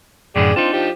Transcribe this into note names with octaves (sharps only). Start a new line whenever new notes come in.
F#2 A2 D3 G#4 D5 G5
C4 D4 D#4 F4
F3 G4